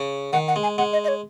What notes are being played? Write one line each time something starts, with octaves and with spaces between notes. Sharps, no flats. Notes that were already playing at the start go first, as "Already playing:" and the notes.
Already playing: C#3
D#3 F#5
F#5
G#3
G#5
G#3 F#5
D#5
D#5
C#5